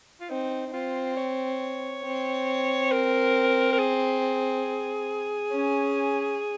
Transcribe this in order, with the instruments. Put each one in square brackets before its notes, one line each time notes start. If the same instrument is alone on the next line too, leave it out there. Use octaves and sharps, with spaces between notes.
[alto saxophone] F4
[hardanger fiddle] C4 [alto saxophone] D#4
[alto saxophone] D#4
[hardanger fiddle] C4 [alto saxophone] F4
[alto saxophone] C#5
[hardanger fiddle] C4
[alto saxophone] A#4
A#4
G#4
[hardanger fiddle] C#4